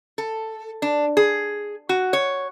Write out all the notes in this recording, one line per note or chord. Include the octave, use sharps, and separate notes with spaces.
A4
D4
G#4
F#4
C#5